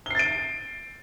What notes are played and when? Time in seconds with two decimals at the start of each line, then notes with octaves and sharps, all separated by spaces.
0.06 G7
0.10 C7
0.15 A6
0.19 D7